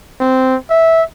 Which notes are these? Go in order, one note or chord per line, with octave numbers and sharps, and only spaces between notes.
C4
E5